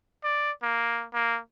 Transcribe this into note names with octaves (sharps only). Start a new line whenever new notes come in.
D5
A#3
A#3